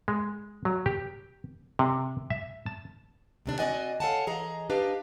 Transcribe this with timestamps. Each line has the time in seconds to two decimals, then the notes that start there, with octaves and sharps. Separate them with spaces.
0.08 G#3
0.65 F#3
0.86 G4
1.79 C3
2.30 E5
2.66 A5
3.46 D2 C3 D4
3.59 C4 D4 F#4 D5 D#5 G#5
4.00 A4 C#5 F5 F#5 G#5 A5
4.27 E3 G#4 D#5 A#5
4.70 D4 G4 B4 D#5 F5